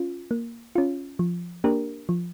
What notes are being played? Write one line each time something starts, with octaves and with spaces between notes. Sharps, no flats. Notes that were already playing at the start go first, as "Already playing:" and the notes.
Already playing: C#4 F4
A#3
C#4 F4
F3
A#3 D4 G4 A#4
F3